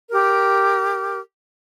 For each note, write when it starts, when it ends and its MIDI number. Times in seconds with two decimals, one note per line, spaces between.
0.11 1.18 67
0.11 1.18 70